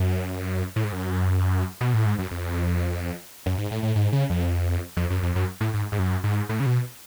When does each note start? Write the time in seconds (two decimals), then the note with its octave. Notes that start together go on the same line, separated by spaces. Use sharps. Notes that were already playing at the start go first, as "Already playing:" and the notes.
Already playing: F#2
0.76 A2
0.84 G#2
0.93 F#2
1.81 B2
1.94 A2
2.06 G#2
2.18 F#2
2.31 F2
3.46 F#2
3.58 G#2
3.71 A2
3.83 A2
3.96 G#2
4.13 C#3
4.30 F2
4.97 F2
5.10 F#2
5.23 F2
5.35 F#2
5.61 A2
5.74 G#2
5.92 G#2
5.99 F#2
6.24 G#2
6.49 A2
6.60 C#3
6.66 B2